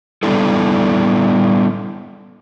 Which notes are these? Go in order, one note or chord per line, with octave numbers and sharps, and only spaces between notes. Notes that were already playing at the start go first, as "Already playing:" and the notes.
G3 B3 D4 E4 A4